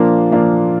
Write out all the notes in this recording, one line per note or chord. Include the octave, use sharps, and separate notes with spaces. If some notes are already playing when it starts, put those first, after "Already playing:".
Already playing: A#2 F3 A#3 D4 F4
A#2 F3 A#3 D4 F4